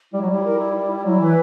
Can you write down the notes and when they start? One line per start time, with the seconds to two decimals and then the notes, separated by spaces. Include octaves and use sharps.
0.12 G3 E4
0.22 F#3
0.28 G3 E4
0.44 A#4
0.59 E4
0.75 E4
0.90 E4
1.05 F#3 E4
1.19 E3 B4